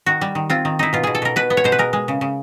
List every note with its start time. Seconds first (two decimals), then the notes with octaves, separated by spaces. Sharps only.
0.06 D#3 F#4
0.21 G3
0.35 D#3
0.50 C4 F4
0.65 D#3
0.79 D#4 E4
0.93 B2 F4
1.03 B2 G#4
1.15 A4
1.22 B2 A#4
1.36 B2 B4
1.50 B3
1.57 C#5
1.64 B2 C5
1.72 B4
1.79 G#3 A#4
1.93 G#3
2.08 C#3
2.21 C#3